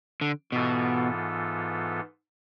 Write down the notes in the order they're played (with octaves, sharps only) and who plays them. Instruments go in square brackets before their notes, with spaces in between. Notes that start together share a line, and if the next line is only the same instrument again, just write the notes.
[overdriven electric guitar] D3
[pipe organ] G#2 E3 B3 F4 A4 [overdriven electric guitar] B2